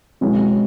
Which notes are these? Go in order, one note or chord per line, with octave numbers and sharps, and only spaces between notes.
B2 G#3 C#4 E4